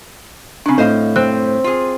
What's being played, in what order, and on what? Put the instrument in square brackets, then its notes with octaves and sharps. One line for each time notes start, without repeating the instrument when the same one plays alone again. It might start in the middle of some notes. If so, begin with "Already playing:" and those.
[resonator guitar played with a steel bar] C#3 F#3 [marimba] C4 D4
[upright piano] A2 [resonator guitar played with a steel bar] C5 D#5 F5
[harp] C4 [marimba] F#6
[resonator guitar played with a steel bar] F4 G#4